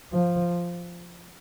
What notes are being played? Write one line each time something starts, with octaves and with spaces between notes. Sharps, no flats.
F3